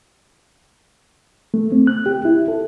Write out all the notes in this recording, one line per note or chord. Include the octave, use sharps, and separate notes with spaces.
A3
C4
F#6
G4
E4
A4